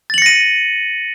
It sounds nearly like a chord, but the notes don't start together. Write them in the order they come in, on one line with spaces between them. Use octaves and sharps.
A6 F#7 C#7 A#6 D#7